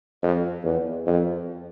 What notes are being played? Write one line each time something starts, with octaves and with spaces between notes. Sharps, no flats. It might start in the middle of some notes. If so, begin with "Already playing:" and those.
F2
E2
F2